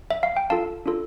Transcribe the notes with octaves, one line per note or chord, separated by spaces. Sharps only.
E5
F5
G5
D4 F4 A4 F5 A5
D4 F4 A4